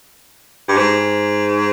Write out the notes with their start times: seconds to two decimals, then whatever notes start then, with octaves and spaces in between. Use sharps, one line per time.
0.69 G2
0.77 G#2